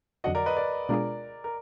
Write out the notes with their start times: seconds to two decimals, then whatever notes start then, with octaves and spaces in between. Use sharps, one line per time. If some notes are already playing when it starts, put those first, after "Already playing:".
0.24 F2 D3 F#3 D4 F#4 D#5 F#5
0.35 A#4 D5
0.46 B4 D#5
0.57 A#4 D5
0.89 B2 G#3 D4 F4 G#4 A#4 D5
1.44 A#4